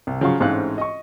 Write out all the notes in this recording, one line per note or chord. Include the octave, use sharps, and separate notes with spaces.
C2
C#3 F3 F#3 F5 C#6
A1 G#2 C4 C#4 F5 F#6
D#5 C#6